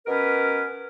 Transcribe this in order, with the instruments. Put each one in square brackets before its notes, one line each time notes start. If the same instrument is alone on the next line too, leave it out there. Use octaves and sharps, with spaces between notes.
[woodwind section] B2 C#4 A#4 B4